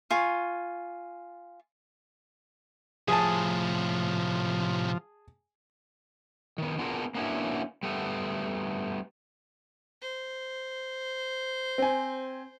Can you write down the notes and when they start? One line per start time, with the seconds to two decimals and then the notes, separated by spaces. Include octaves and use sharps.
0.11 F4 G#5 C#6
3.08 A2 C3 F3 G#4 G#5 A5
6.58 D#3 B3
6.78 B3 D4 F4 G#4 A#4
7.15 A#3 B3 C#4 D4 E4 F#4
7.83 G3 A3 B3
10.02 C5
11.78 C4 G#5